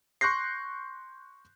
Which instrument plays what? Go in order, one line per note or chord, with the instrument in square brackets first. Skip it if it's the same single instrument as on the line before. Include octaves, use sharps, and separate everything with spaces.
[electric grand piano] C6 C#6 F#6 G6 A#6 C7